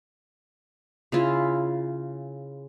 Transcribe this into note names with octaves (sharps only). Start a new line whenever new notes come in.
C#3 E4 F4